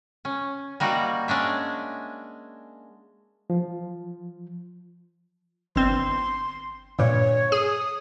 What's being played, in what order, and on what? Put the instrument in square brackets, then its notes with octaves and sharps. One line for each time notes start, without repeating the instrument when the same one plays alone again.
[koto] C#4
G3 A#3 D#4 F#4
G#3 C#4 D4 E5
[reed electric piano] F3
[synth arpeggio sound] G1 C4 [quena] C6
[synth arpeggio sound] G2 A#2 [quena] C#5
[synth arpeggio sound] G#4 [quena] D#6